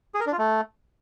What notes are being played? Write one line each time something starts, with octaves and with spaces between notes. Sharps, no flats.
G#4
A#4
D4
F4
A3